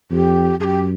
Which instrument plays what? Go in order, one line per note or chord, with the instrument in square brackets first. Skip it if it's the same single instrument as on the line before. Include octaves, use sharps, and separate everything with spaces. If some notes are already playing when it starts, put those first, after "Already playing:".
[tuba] F2 [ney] G4
[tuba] F#2 [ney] G4 G#4